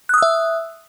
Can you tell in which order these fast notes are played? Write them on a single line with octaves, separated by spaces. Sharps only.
F#6 D#6 E6 E5